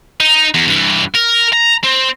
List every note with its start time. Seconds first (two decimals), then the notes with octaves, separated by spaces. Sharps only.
0.20 D#4
0.54 E2
0.68 G2 E3
1.15 A#4
1.53 A#5
1.84 C4